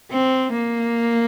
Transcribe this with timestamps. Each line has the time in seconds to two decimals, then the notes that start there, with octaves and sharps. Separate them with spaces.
0.11 C4
0.53 A#3